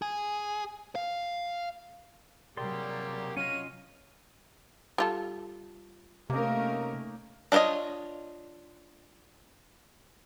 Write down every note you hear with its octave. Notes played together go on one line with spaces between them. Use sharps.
G#4
F5
C3 F#3 G3 A#3 G4 G#4 D5 C6
C#4 F4 C#5 D#5 F5 D#7
G3 F4 A4
C3 A3 A#3 C#4 D#4 A#4
D4 F4 C5 C#5 D#5